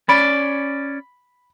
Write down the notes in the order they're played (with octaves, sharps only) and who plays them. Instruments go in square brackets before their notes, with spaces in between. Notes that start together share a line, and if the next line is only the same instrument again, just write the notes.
[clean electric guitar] C#4 D5 [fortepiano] B5